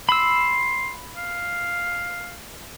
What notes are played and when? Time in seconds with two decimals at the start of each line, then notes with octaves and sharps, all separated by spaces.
0.09 B5 C6 E6
1.17 F5